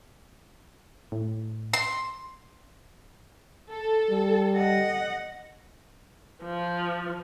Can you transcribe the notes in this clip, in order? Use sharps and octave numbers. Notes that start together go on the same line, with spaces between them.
A2
C6
A4
G3
D#5 F#5
F3